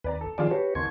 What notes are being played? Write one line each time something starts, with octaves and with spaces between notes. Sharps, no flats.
D#2 B4 D5 A#5
A4
D#3 F3 F4 G#4 D5 A5
F#4 G4 B4 C#5
F#1 D#2 C6 C#6 G#6